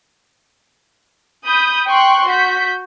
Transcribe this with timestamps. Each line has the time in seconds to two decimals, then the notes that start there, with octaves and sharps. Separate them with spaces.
1.45 B5 D#6 G6
1.88 G5 C6 C#6 F#6
2.28 F#4 G6 B6